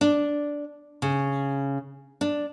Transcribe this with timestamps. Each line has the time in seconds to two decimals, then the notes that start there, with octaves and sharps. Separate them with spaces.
0.01 D4
1.02 C#3
2.21 D4